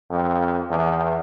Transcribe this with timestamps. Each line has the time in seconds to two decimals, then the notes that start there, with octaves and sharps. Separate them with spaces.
0.10 F2
0.70 E2